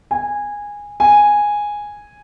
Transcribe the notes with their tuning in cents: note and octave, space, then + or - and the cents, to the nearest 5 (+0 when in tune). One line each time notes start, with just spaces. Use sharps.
G#5 -15
G#5 -5